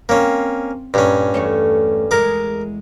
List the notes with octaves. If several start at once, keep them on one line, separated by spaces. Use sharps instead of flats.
A#3 C4 C#4
G2 A#2 C#4 A#4
E2 A3 C#5
E2 G#3 A#4 D6